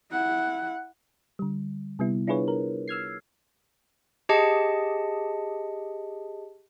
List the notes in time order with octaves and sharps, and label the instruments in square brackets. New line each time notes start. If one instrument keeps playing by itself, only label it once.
[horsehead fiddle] E4 F#5
[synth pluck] D3 G3
C3 G3 B3 E4
D4 E4 F4 G#4 B4 C#5
A#4
E6 F6 G#6 C7
[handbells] G4 G#4 D#5 A5 C#7